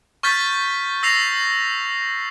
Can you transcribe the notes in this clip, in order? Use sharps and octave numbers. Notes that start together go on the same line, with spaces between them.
C#6 F6 G6 A6 B6
E6 A#6 C7 F7